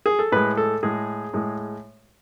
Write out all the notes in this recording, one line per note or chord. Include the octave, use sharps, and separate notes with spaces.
G#4
A4
A2 G#3 B4
A4
A2 G#3 G#4
A2 G#3